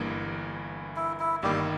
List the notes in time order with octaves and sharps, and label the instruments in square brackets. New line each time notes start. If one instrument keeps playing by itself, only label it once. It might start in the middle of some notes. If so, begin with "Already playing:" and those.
Already playing: [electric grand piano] G1 G2 E3 A#3
[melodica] E4
E4
[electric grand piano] G1 G2 D#3 A#3 [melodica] G3 G4